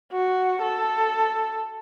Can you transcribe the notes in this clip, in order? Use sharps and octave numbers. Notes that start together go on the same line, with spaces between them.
F#4
A4